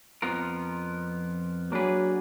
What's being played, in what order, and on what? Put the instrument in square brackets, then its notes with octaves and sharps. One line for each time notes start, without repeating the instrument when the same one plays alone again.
[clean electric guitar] F2 F3 B3 F4 A#4
[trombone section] F#3 [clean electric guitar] A#3 D4 G#4 B4